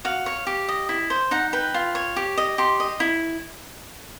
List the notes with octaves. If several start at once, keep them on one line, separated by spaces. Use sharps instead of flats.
F#4 F5
C#5
G4
D#5
E4
C5
D#4 F#5
B4 G5
F4
C#5
G4
D#5
G4 C6
D#5
E4